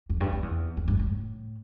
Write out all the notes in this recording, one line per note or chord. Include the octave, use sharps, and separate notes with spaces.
F2
G2
F2
E2
F2
G2
A2